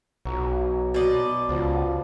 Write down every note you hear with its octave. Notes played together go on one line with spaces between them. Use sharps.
B1 F#3
B2 D5 D#5
C#2 F3